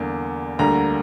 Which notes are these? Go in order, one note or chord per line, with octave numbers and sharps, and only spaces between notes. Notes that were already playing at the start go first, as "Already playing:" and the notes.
Already playing: E2 D3 G3 A#3
D2 D3 G3 A#3 A#5